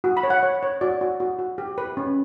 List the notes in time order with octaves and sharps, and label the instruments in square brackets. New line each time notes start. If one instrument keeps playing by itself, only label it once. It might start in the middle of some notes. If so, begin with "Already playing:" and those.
[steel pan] F#4
B5
C#5
F#5
C#5
C#5
F#4 D5
F#4
F#4
F#4
G4
B4
C#4